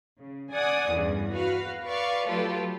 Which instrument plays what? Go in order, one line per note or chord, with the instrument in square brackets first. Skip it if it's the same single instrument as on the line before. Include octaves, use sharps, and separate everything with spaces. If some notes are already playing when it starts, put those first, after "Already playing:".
[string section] C#3
D5 F#5 G#5 D#6
E2 G2 C#3
F#4 B4 F5
B4 D5 F5 C#6
F#3 A3 F4 G4 A4 B4